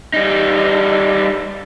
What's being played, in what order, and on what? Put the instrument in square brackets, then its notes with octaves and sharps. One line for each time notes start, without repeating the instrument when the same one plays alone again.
[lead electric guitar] G3 D#4